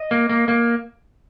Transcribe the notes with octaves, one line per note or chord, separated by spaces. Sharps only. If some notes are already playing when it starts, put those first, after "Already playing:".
Already playing: D#5
A#3
A#3
A#3